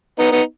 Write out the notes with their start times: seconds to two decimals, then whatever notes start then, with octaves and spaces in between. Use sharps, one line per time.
0.19 B3 D#4
0.32 B3 D#4